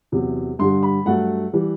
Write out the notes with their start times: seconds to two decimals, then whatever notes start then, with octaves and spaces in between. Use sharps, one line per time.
0.12 E2 C3 F#3
0.59 G2 D3 G3 C6
0.83 B5
1.06 G2 F#3 A3 F#5
1.53 E3 G3